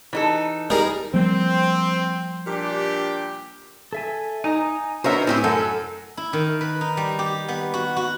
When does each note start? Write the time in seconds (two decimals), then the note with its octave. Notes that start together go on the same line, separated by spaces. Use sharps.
0.13 E3 D#4 A4
0.70 G3 D#4 G#4 A#4
1.14 F3 G3 A#3 C4
2.47 A#2 D4 G4
3.93 A4 E5 G#5
4.44 D#4 G#5 A#5 D#6
5.04 B3 D4 D#4 F#4 A#4 C5 C#5 E5
5.27 A2 C4 E4 G4 G#5
5.44 F#2 A4
6.17 E4
6.33 D#3
6.61 B4
6.81 D#4
6.97 G3
7.19 G4
7.48 B3
7.74 F#4
7.96 F#4